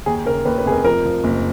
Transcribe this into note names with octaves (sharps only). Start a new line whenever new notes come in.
D#2 G#4
C#3 A#4
D#2 B4
B4
F1 G#4
A#4
F3 A#4
F3
F#1